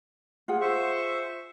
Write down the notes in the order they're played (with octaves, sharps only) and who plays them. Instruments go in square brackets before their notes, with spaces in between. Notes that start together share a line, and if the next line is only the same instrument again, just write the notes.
[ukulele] F4 G#4 F#5
[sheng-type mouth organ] C5 E5 C#6